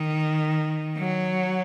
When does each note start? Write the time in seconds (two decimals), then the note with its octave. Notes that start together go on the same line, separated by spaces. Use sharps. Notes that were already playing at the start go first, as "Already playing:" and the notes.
Already playing: D#3
0.98 F#3